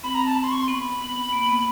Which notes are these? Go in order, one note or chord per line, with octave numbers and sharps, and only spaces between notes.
C4 B5
A#5
A5
B5
C6
C#6
C6
B3 B5
A#3
B3